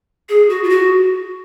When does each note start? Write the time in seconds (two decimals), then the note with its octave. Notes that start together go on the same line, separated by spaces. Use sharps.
0.29 G#4
0.50 F#4
0.64 F4
0.69 F#4